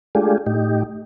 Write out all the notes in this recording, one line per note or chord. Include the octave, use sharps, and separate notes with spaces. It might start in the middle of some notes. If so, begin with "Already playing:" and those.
G#3 A3 D4 F4 G4 G#4
A2 D#4 G4